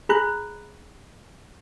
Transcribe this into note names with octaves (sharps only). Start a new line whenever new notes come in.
G#4 A#5 B5 F#6